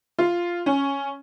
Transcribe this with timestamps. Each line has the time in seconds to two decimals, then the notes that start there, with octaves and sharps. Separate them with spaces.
0.19 F4
0.66 C#4